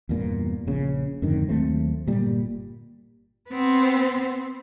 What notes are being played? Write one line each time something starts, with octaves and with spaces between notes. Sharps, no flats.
E2 G2 A#2 B3
A#1 C#3
F2 G#2 D3 D#3
D#2 F#3 A3 C4
G1 A#2 G3
B3 C4